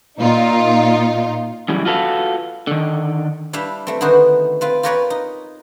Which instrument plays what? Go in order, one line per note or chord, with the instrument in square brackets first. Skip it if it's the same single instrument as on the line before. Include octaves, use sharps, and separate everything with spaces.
[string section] A#2 D#4 F4
[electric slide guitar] F#2 C#3 E3 G3
F4 F#4 A4 B4 F5
D3 D#3
[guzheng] G3 D4 E4 G4 E5 F5
G3 A3 C4
D3 D#3 B3 D#4 F#4 C5
C4 F4 B4
F4 G4 A#4 B4 C#5 D5
D#4